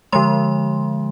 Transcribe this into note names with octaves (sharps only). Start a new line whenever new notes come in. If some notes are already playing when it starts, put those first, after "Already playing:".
D3 F3 G#3 C6